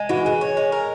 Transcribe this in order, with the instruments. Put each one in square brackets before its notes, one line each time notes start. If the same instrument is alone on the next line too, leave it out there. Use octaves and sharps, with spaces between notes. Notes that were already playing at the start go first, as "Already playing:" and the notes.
Already playing: [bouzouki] G#3
[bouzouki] E3 [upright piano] F#4
[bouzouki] E3 [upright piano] G#4
[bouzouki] C#5
G#3
A#4